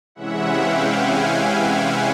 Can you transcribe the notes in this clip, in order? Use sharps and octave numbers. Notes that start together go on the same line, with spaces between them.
C3 E3 G#3 C#4 E4 E5 F#5
F5 G5
F#5 G#5
F5 G5
E5 F#5